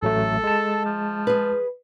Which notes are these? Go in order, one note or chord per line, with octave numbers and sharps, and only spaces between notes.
A1 F#3 A3 A4
G#3 A5
F3
G#4 B4